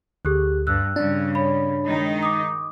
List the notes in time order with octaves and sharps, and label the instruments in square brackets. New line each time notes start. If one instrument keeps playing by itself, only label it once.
[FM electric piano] D2 [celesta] G4 G#4 F#6
[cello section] G2 [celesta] E6 F#6
[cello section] G2 C#3 [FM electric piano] D4
[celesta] C#5 B5
[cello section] D#3 G#3 D#4
[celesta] D6 D#6